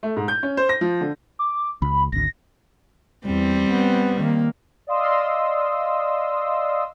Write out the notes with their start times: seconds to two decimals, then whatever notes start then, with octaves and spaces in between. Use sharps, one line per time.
0.03 A3
0.16 G#2
0.28 G6
0.43 C#4
0.57 C5
0.69 A#6
0.81 F3
1.01 D3
1.39 D6
1.82 C#2 B5
2.12 G#1 D2 A#6
3.26 E2 G3 C4
3.70 B3
4.17 D#3 A#3
4.87 D5 D#5 F5 C6 D#6 E6